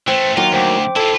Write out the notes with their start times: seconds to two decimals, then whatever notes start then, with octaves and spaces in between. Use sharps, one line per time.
0.08 E3 A3 C5 G5 C#7
0.37 D#2 F#3 A#3 F4
0.53 D2 C5 G5 D6
0.96 E4 F4 A4